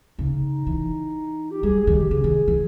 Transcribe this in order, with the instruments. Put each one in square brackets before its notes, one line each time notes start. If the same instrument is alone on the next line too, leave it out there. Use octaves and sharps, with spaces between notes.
[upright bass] C#3 [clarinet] D#4
[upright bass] E3
[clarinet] G4
[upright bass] G3 [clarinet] G#4
[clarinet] G#4
[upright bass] D#3
[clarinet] G4
[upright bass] C#3 [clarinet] G#4
[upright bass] D#3
E3